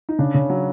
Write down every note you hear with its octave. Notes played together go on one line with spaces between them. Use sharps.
D#4
C#3 D4
C#3
F#3